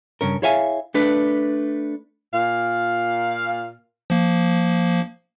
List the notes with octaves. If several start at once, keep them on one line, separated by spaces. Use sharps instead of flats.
G2 C#3 C#4 A#4
E4 G#4 C#5 E5 F5 G#5
A3 D4 B4
A#2 F5
F3 A#3